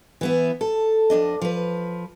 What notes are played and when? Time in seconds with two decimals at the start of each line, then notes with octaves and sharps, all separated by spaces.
0.21 E3 B3 E4
0.61 A4
1.10 F2 G#2 D4 D#5
1.42 F3 B4